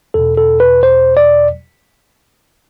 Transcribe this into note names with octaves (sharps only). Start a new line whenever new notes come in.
E2 B2 A4
A4
B4
C5
D5